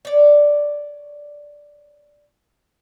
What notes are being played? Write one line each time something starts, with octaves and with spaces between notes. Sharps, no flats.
C#5 D5